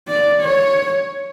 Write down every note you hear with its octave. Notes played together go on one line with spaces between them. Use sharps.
D5
C#5